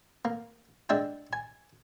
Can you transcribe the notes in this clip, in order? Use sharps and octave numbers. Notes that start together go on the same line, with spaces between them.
A#3
G#3 D4 E5 F#5 G5
G#5